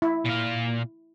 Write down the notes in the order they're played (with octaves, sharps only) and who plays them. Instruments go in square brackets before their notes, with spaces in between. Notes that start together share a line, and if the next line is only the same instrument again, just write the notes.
[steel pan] E4
[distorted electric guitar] A#2 F5